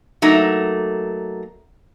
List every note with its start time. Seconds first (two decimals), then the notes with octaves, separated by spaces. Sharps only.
0.22 F#3 A3 A#3 D#4